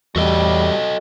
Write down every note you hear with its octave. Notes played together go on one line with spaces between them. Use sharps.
E2 A2 G3 F#4 A4 D#5